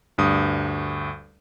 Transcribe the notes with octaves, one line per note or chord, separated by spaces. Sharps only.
D2 G2 D#6